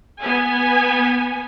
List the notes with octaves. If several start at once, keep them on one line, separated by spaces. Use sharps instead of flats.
B3 G#5